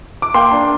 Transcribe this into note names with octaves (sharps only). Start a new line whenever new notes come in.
D6
A#3 G5 C6
D4